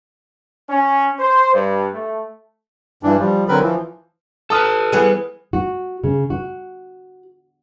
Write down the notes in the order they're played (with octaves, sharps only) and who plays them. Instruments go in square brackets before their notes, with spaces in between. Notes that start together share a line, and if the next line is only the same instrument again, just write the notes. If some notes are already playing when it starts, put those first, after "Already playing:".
[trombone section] C#4
C5
G2
A3
[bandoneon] G2 E3 D4
F3 G3
D3 F#3 C4 A#4 B4 B5
E3 F3
[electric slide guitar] A4 B4 [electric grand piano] A5 D#6 F6
[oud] E3 B3 G#4
[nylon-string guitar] F#4
C#3
F#4